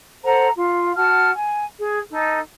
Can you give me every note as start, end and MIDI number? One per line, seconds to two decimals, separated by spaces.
0.24 0.48 69
0.24 0.48 72
0.24 0.48 78
0.24 0.48 82
0.56 0.91 65
0.96 1.30 66
0.96 1.30 78
0.96 1.30 81
0.96 1.30 89
1.34 1.63 80
1.78 1.98 68
2.10 2.39 63
2.10 2.39 69